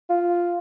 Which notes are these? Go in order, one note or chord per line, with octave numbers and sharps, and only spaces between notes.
F4